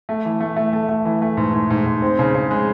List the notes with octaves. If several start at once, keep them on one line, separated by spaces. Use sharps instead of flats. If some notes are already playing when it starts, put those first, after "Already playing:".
A3
E3
A3
A3
A3
A3
E3
A3
G#2
G#2
G#2
G#2
C4
C#3
C#3
G#3